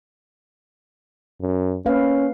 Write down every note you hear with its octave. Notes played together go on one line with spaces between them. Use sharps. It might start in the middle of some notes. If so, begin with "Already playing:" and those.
F#2
A#3 C#4 B4 F5